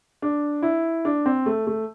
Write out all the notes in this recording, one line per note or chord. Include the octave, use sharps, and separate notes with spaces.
D4
E4
D4
C4
A3
A3